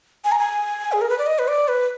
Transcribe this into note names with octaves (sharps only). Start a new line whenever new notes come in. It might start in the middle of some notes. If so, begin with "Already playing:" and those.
G#5
A#5
G#5
G#4
A#4
B4
D5
D#5
B4
D5
B4